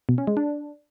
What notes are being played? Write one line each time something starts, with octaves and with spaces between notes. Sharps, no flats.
B2
C#4
G#3
D4